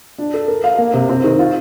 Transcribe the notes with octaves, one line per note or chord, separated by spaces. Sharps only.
D4
A4
A#4
F5
A#3
C3
C4
D#3
F4